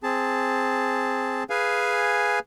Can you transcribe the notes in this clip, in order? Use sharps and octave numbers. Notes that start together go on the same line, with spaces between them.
C4 G#4 A5
G#4 B4 F5 G#5